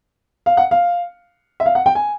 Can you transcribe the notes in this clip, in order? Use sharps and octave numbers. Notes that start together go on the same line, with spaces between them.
F5
F#5
F5
E5
F5
F#5
G5
G#5